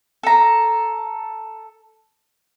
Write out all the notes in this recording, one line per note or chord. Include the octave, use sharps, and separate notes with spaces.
A4 A#5